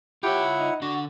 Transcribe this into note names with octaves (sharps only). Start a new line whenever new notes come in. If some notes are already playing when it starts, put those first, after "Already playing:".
E4 F4 G4 C#5 F#5
D#4
D3 D4 F#4